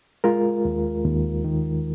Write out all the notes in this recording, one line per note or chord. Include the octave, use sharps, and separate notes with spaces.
G#3 F4 A#4
D#2
D#2
D#3